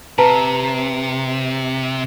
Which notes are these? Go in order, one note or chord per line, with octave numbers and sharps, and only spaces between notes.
C3 B4 A5 A#5